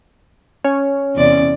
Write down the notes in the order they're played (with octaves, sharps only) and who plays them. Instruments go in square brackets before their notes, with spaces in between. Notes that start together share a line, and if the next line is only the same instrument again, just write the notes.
[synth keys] C#4
[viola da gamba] E2 C3 D5